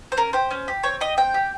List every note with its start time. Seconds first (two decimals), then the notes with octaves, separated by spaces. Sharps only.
0.12 C5
0.17 C#4 A#4
0.33 G4 C5
0.51 C#4
0.68 G4
0.83 C4 C#5
1.00 G4 D#5
1.17 C4 G5
1.34 G4